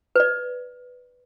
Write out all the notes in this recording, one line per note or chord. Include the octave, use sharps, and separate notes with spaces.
B4 D5